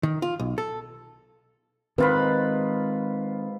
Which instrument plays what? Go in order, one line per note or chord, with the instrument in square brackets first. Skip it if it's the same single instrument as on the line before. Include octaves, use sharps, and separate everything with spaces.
[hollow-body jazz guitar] D#3
F4
B1
A4
[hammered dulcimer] G#2 F4 B5 [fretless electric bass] D#3 C4 [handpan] A#4 B4